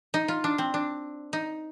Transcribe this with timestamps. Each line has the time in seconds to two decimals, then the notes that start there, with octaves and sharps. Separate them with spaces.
0.14 D#4
0.28 F4
0.44 D4
0.58 C4
0.74 D4
1.33 D#4